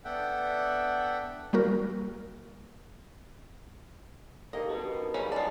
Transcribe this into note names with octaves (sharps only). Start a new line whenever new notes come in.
B3 D4 A4 E5 F#5 G5
G3 A#3 F#4 A#4
A#3 D#4 G4 A4 D#5
G2 C#3 F#4 B4 A5
D#3
G3 C#4 G#4 A#4 B4 E5 F5
C#3 B3 D#4 F#4 A4 D5 G#5 A5